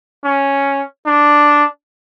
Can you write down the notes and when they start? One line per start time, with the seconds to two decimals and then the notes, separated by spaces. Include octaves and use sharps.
0.25 C#4
1.06 D4